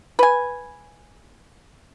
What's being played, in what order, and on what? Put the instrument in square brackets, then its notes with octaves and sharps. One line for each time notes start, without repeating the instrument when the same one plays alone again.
[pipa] B4 G#5